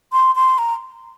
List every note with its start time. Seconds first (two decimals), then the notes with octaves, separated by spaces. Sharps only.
0.13 C6
0.35 C6
0.58 A#5